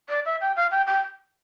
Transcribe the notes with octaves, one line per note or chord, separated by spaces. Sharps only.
D5
E5
G5
F5
G5
G5